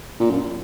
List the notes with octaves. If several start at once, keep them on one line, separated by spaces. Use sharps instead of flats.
A#2
F#2